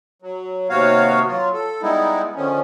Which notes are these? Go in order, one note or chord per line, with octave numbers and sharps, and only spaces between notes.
F#3
D#2 C3 B3 F#4 C#5 F5
F#3 F4
A4
G3 G#3 B3 D#4 E4
D3 D#3 F3 C#4